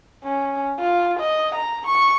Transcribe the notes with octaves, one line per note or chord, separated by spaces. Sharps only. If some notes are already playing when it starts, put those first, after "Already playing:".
C#4
F4
D#5
A#5
C#6